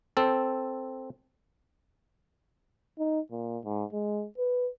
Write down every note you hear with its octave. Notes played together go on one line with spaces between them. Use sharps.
C4 A4
D#4
A#2
G#2
G#3
B4